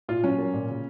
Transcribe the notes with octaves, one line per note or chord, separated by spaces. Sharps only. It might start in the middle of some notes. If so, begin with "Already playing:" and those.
A#2 F4
F#3 C#4
A#3
A#2
C#3